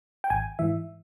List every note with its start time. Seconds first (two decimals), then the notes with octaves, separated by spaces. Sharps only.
0.24 G5
0.30 G#1 G#5
0.59 G#2 E3 E5